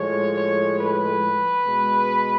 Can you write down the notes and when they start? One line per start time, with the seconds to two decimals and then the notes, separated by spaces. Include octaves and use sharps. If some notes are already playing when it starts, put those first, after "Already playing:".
Already playing: A2 F3 G#3 C#5
0.35 C#5
0.77 B4
1.63 B2 G#3